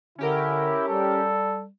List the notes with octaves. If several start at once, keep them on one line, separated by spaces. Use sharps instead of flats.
D3 C#4 E4 G4 A#4
G3 A4